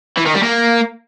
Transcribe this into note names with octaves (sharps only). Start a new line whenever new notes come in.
E3
D#3
G3
A#3